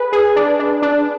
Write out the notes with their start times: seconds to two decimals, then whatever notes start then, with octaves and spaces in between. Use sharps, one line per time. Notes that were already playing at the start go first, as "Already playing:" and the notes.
Already playing: G#4 B4
0.13 G#4
0.36 D4
0.59 D4
0.82 D4